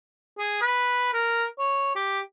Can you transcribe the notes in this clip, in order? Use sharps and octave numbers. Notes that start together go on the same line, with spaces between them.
G#4
B4
A#4
C#5
G4